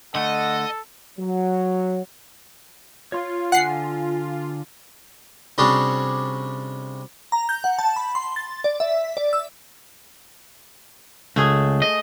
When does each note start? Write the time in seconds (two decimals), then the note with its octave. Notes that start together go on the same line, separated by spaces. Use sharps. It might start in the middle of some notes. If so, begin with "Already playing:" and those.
0.15 D3 A3 A4 D#5 F#5
1.19 F#3
3.12 F4 C#5 C6
3.52 D3 F#5 G#5 C7
5.58 C3 G3 C#4 D4 F#4 G#4
7.32 A#5
7.49 G6
7.64 F#5
7.79 A5
7.96 B5
8.15 C6
8.36 A6
8.64 D5
8.80 E5
9.17 D5
9.33 E6
11.36 C#2 A3 G#4
11.82 D#5